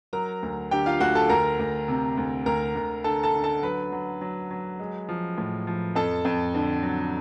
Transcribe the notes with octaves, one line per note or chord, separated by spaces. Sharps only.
F#3 A#4 A#5
D2
D3 G4 G5
F4 F5
D2 F#4 F#5
A4 A5
D2 A#4 A#5
D2
C3
D2
D2 A#4 A#5
D2
D3 A4 A5
A4 A5
D3
A4 A5
F#3 B4 B5
F#3
F#3
F#3
G#3
F3
A2
F3
F2 A4 A5
F2
D3
F#3